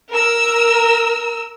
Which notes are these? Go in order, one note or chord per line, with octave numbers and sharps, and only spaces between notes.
A#4 E6